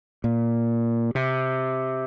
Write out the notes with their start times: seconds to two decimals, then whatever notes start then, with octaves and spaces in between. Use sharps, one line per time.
0.24 A#2
1.15 C3